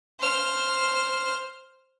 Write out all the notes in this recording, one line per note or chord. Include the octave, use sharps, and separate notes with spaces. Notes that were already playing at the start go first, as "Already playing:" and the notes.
C5 F6